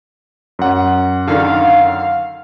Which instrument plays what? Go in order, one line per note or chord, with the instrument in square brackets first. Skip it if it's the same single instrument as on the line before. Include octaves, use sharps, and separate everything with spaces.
[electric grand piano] F#2 F#5
[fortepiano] D3 D#3 [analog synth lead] F5